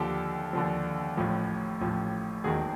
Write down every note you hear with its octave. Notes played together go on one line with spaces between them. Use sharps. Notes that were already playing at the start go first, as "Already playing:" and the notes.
Already playing: D#2 D3 F3 G4 A4
D#2 D3 F3
A1 A2 F3
A1 A2 F3
E1 D#2 D#3 F#4 G#4